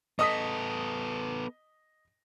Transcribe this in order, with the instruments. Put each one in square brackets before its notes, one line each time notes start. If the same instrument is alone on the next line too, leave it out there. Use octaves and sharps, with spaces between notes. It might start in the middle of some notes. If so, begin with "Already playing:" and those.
[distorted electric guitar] B3 A4 [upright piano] D#5 D#6 B6